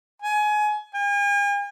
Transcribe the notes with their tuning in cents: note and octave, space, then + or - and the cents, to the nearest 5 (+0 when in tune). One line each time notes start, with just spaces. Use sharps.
G#5 +25
G#5 -45